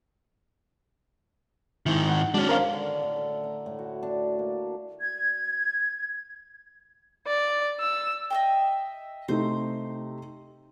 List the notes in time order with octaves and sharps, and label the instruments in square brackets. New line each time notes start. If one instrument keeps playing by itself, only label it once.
[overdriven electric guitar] G#2 D#3 [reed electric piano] E4
[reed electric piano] F#5
[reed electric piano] G#3 F#4 [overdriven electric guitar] C#4 D4
[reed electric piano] A#4 C5 F5
[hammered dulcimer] D3
A2
A4
A#5
A2
F#4
D4
A#3
[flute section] G#6
[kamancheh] D5
E6
[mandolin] D#5 E5 G5
[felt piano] C3 A3 D#4 [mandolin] C5